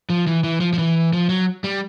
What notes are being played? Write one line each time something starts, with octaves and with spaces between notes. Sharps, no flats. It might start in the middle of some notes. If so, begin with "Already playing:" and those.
F3
E3
E3
F3
F3
E3
F3
F#3
G3